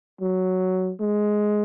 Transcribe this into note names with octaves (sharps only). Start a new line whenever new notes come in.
F#3
G#3